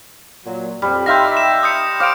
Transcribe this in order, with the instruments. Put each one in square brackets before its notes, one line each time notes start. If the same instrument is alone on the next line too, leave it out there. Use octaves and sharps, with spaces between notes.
[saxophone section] A#2 F#3
[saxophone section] F2 [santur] G3
[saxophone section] D#4 E5 [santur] F5 G5 C6 [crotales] G6 A#6
[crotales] E7
D#6 G6 C#7
[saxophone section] C5 [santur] F5 [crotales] D6 D7